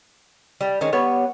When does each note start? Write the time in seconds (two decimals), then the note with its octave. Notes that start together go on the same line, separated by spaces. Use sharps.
0.61 G3
0.81 D#3 G#3 C#4
0.92 G3 B3 C#5